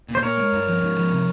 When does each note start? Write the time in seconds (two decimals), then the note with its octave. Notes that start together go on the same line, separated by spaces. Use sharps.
0.08 A#2
0.15 C5
0.23 A#2 A#4 C#5
0.37 G#3
0.52 G2
0.67 F3
0.82 G#2
0.97 F3
1.11 C3